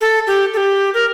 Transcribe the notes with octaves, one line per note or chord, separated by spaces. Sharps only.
A4
G4
A4
G4
A#4